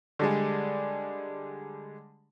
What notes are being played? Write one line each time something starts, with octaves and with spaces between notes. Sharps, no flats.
D3 G3 G#3